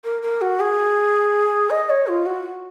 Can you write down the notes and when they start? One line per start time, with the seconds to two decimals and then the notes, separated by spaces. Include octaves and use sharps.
0.04 A#4
0.22 A#4
0.41 F#4
0.60 G#4
1.70 D#5
1.90 C#5
2.07 F4
2.26 F#4